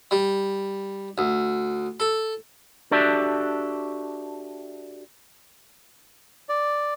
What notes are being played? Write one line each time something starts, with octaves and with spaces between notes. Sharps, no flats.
G3
D2
A4
D4 F#4 G4 A4 D5 E5
D5